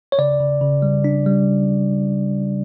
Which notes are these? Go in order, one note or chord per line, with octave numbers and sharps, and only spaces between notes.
C#5
C#3 D5
C#3
C#3
G3
D4
G3